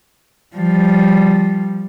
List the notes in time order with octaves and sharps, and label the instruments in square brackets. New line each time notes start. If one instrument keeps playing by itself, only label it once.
[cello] F3 G3